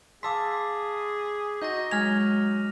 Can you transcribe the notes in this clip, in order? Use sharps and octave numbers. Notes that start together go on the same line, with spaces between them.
G#4 F5 A5 C6 D6 E6 B6
D#4 F#4 D#5 G6 A#6
F#3 G#3 F6 G#6 F7